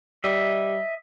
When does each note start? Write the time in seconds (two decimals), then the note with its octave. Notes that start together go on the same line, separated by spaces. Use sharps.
0.24 G3 D#5 E5